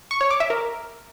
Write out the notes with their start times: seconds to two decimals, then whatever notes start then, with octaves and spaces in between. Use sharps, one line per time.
0.11 C#6
0.21 C#5
0.30 D6
0.40 E5
0.50 A#4